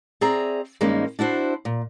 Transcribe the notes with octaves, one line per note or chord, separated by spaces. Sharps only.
C4 G#4 D5 E5 A#5
G2 D#3 G#3 A#3 C#4 D#4
D4 E4 F#4 C5
A#2